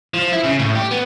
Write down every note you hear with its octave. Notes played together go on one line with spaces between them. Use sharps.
F3
E4
C#3
A2
G4
B3